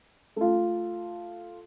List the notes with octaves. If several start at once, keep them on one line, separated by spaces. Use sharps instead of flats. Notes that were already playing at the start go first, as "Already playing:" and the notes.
A3 F4